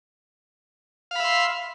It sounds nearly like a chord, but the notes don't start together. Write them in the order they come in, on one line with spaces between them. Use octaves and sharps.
F5 B5 E5 C6